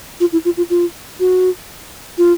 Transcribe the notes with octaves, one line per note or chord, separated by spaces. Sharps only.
F4
E4
F4
F4
F4
F#4
F4